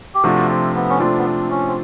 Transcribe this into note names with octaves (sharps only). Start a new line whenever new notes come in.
G4
C3 F3 A3 D4 F4 F#4
C4
B3
C#4
C3 F3 A3 C4 D4 F4
B3
C4
C#4
C4